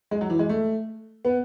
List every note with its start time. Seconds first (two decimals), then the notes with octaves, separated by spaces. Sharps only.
0.11 G#3
0.21 F#3
0.30 E3
0.39 G#3
0.49 A3
1.25 B3